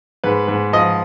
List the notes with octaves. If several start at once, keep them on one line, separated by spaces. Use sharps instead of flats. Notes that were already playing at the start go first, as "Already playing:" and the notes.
G#2 B4
G#2
F3 D#5